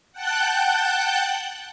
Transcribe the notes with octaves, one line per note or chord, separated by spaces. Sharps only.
F#5 G5 A5 F#6 G6